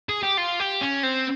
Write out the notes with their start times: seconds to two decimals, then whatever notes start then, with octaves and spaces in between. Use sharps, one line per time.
0.09 G#4
0.23 G4
0.37 F4
0.59 G4
0.81 C#4
1.03 C4